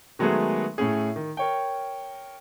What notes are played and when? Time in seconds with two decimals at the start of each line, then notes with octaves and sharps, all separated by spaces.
0.19 D#3 F#3 G#3 A3 B3 G#4
0.78 A2 A3 C#4 G#4
1.16 D#3
1.37 A#4 C#5 G5